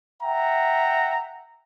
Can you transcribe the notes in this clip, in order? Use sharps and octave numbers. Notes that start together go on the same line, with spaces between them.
E5 F#5 G5 A#5